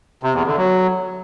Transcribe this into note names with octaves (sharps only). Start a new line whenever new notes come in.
C3
E2
D3
F#3